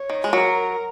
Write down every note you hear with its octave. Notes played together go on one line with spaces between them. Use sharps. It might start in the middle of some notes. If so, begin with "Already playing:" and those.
Already playing: C#5
D#3
G#3
F#3 A#4